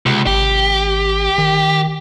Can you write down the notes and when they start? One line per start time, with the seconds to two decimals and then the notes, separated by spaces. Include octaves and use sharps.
0.06 C#2 C3
0.27 G#1 G4
1.38 D#3